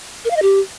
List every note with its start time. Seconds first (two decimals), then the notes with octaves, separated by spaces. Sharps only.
0.25 A#4
0.31 F5
0.36 D#5
0.42 G4